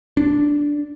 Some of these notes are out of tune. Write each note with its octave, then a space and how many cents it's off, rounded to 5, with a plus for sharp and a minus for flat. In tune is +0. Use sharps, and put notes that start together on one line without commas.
D4 -5